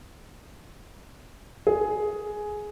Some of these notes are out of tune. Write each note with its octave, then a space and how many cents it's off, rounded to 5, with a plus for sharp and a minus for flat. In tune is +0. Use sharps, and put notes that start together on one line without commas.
G#4 +10